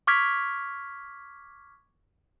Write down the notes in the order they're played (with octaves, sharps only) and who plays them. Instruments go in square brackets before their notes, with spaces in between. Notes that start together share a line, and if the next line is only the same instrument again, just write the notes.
[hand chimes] C#6 D6 F6 G#6 B6